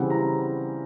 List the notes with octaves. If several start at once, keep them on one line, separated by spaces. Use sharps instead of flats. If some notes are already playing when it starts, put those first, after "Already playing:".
Already playing: C#3 E3 G3 C4 E4 F#5
A#5